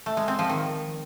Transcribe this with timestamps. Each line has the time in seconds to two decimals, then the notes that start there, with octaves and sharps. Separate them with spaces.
0.06 A3
0.17 G#3
0.28 C4
0.39 F3
0.50 D#3